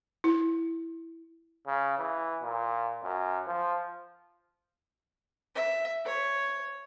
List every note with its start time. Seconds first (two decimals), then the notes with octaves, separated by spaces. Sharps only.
0.24 E4
1.67 C#3
1.98 E3
2.43 A#2
3.03 F#2
3.47 F3
5.54 E5
6.06 C#5